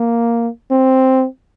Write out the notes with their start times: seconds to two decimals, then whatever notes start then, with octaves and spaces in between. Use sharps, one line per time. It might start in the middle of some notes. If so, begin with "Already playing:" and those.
Already playing: A#3
0.71 C4